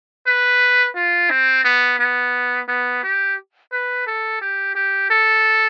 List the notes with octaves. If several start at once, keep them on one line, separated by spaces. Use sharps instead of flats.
B4
F4
C4
B3
B3
B3
G4
B4
A4
G4
G4
A4